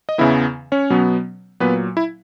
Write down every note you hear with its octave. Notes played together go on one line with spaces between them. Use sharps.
D#5
E2 C#3 E3 B3 E4 E5
C#4 C#5
B2 F#3 B3
A#2 F#3 B3 B4
E4